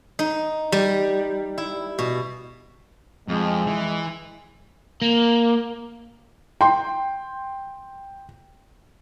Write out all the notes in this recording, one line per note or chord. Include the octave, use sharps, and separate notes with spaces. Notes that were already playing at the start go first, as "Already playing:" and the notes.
D#4
G3
E4
B2
F2 G#3
E3
A#3
G5 C6